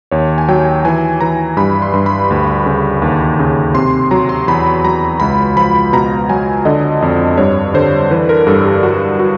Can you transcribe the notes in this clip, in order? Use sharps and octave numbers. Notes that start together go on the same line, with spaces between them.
D#2 C#5
G#5
F#3 G5
E3 G#5
E3 A#5
G2 B5
C6
G2
B5
D2
C#3
D#2
C#3
C3 C6
F#3 A#5
C6
E2 B5
F#3 A#5
C#2 B5
F3 B5
B2 A#5
F#3 G#5
D3 D#5
F2 D#5
G2 C#5
D3 C5
E3 B4
A#4
G2 A4
G4
F#3 F#4
F#4